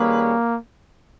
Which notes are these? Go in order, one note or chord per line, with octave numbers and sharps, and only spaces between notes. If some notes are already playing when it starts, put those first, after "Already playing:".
Already playing: D#3 G3 A#3 C#4 G#4 B4